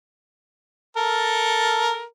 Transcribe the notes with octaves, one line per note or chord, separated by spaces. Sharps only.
A4 A#4